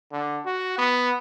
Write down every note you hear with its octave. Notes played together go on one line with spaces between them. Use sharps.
D3
F#4
B3